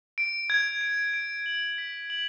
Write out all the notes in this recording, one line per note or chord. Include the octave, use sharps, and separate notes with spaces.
D7
G#6
D7
D7
F#7
B6
F#7